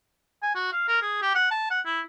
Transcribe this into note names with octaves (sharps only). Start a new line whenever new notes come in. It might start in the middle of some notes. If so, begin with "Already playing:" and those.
G#5
F#4
F5
A#4
G#4
G4
F#5
A5
F#5
E4